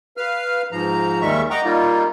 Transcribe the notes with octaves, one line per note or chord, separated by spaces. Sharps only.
B4 F5 F6
G#2 F3 A#5
D#2 D#3 G3 G#3 E5 C#6
D#5 F#5 G5 A#5 C#6 D6
G3 A#3 D#4 F4